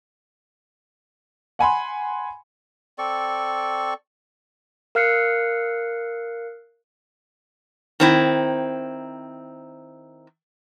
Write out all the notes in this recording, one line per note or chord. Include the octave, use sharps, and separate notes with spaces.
F#5 G#5 B5 C6
C4 A4 D5 C#6
A#4 F5 F6 F#6 C7 C#7
D#3 C4 E4